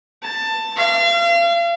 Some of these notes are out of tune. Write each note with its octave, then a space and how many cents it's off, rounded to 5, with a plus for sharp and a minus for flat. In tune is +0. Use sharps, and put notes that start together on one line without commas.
A5 +15
F5 -35